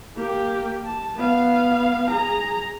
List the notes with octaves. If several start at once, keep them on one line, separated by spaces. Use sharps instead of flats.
A#3 G4
A5
B3 F5
G#4 A#5